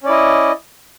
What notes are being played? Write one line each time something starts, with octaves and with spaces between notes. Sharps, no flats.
C#4 E4 D5 D#5